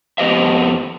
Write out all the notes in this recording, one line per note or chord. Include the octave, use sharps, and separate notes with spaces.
F2 B3 G4 D#5 E5